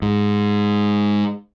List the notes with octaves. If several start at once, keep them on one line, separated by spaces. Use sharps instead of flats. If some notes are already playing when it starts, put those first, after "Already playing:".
G#2